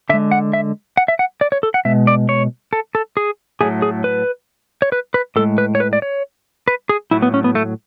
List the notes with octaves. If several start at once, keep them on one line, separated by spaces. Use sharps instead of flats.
D3 G#3 E5
F#5
E5
F#5
E5
F#5
D5
C#5
A4
F#5
B2 G#3 E5
D5
C#5
A4
A4
G#4
A2 F#3 A3 G#4
G#4
B4
C#5
B4
B4
A2 G#3 A4
B4
C#5
B4
D5
C#5
B4
G#4
A2 F#3 A3 E4
B3
C#4
B3
A3